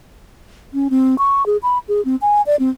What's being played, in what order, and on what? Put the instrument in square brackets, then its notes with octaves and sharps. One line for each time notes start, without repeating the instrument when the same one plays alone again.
[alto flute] C#4
C4
C#6
G#4
B5
G#4
C4
G#5
D5
C4